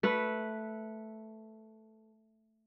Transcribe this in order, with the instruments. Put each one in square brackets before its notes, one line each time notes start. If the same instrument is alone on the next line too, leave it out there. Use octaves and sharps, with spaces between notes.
[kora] A3 B4